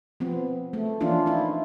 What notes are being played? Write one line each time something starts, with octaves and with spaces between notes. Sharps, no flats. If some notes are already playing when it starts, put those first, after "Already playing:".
F3 B3 C4
A3
E3 F3 A#3 C#4 D4 F4
D#4 E4